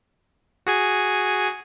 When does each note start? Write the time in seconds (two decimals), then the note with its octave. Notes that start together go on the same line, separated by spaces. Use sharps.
0.67 F#4 G#4 G#5